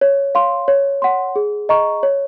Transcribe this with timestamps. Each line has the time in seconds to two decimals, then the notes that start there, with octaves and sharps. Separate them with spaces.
0.01 C#5
0.35 F5 C6
0.68 C#5
1.02 F#5 C6
1.36 G#4
1.69 D#5 A#5 C#6
2.03 C#5